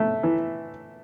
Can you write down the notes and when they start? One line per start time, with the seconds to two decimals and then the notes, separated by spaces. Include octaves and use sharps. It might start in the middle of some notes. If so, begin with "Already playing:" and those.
Already playing: A3
0.23 E3